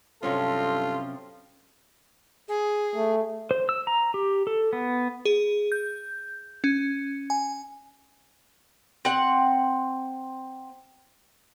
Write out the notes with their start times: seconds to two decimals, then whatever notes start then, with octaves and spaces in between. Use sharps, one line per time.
0.23 G2 C3 F3 F#3 C4 C#4 F4 A4
2.48 G#4
2.95 A3
3.51 C5
3.69 E6
3.87 A#5
4.14 G4
4.47 A4
4.73 B3
5.25 G#4
5.72 G6
6.64 C#4
7.30 G#5
9.05 C4 F#5